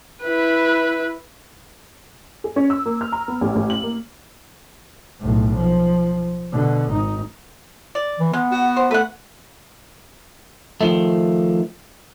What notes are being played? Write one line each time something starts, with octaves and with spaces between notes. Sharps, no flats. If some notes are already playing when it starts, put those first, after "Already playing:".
E4 B4
G#4
C#4
E6
A#3
F6
A#5
B3
A1
A1
F#7
A#3
B1 A2
F3
B2 D3
G#1 D#4
D5
E3
G#3 B3
F#4
C5
A3 B4 F#5
D#3 F3 A3